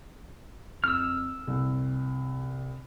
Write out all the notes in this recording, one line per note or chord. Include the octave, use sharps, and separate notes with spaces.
F2 E6 F6
C2